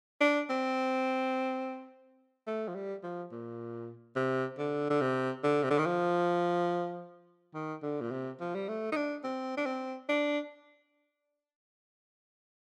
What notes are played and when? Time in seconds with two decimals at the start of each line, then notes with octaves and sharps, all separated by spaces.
0.21 D4
0.50 C4
2.47 A3
2.68 F3
2.75 G3
3.04 F3
3.32 A#2
4.16 C3
4.58 D3
4.90 D3
5.01 C3
5.44 D3
5.63 C3
5.70 D3
5.78 D#3
5.86 F3
7.55 D#3
7.83 D3
8.01 A#2
8.11 C3
8.40 F3
8.55 G3
8.69 A3
8.92 D#4
8.96 D4
9.24 C4
9.57 D4
9.66 C4
10.09 D4